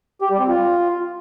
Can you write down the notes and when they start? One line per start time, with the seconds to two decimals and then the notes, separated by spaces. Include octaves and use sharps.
0.21 G4
0.30 G3
0.39 C4
0.48 F4